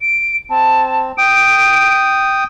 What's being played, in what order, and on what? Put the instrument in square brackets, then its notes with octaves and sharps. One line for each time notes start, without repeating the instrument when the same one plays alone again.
[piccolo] D7
[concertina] C4 [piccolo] A5
[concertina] G5 D#6 [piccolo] D7